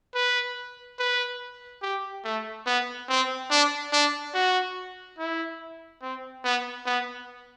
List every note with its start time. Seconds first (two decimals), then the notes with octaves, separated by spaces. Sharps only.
0.15 B4
0.99 B4
1.82 G4
2.25 A3
2.66 B3
3.09 C4
3.51 D4
3.92 D4
4.34 F#4
5.18 E4
6.02 C4
6.44 B3
6.86 B3